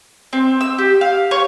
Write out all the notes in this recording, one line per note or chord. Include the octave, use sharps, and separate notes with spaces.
C4
E6
G4
F5
C#5